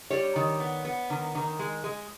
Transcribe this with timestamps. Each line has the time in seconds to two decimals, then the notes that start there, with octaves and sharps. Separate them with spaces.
0.10 G3 C#5
0.36 D#3
0.60 B3
0.85 B3
1.10 D#3
1.35 D#3
1.59 G#3
1.84 G#3